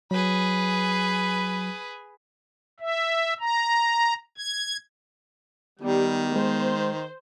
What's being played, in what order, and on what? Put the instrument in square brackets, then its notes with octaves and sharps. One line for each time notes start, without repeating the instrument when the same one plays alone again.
[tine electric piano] F#3 [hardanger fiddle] G#4 B4
[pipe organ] E5
A#5
G#6
[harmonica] D#3 [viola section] G3 [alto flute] B3
[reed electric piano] G#3 [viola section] C5